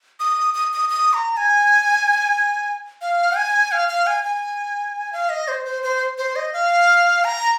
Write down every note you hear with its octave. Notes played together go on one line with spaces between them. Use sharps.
D#6
D#6
D#6
D#6
A#5
G#5
F5
G#5
F5
F5
G#5
G#5
F5
D#5
C5
C5
C5
C5
D#5
F5
A#5